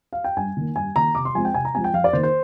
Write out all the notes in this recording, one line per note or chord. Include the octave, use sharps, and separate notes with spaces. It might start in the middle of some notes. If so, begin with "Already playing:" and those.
F5
G5
G2 G#5
D#3 A#3
G2 G#5
D#3 A#3 A#5
C3 D6
C6
F3 G#3 C4 G#5
G5
C3 G#5
A#5
F3 G#3 C4 G#5
G5
F2 F5
D5
D#3 A#3 C5
C5